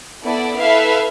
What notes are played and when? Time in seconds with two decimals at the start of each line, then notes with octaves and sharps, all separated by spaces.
0.24 B3 E4 A4 D5
0.58 E4 A4 B4 E5 F5